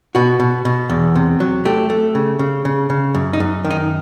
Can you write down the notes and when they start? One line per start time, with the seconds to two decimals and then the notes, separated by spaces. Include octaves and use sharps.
0.15 B2 F#4
0.40 B2
0.65 B2
0.90 E2
1.15 C3
1.40 F#3
1.65 A3 G4
1.90 A3
2.15 C#3
2.39 C#3
2.65 C#3
2.90 C#3
3.15 F#2
3.33 D#4
3.40 F#2
3.65 D#3
3.70 D#4